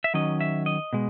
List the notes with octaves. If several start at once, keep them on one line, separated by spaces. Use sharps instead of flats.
E5
D#3 F#3 C#4 D#5
E5
D#5
B2 G#3